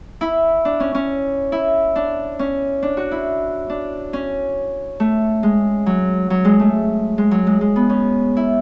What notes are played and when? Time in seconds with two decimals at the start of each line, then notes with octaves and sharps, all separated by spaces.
0.21 E4
0.65 D4
0.80 C#4
0.94 C#4
1.52 E4
1.96 D4
2.39 C#4
2.83 D4
2.97 F#4
3.11 E4
3.70 D4
4.13 C#4
5.00 A3
5.43 G#3
5.86 F#3
6.30 F#3
6.45 G#3
6.60 A3
7.18 G#3
7.31 F#3
7.47 G#3
7.61 G#3
7.76 B3
7.89 C#4
8.37 E4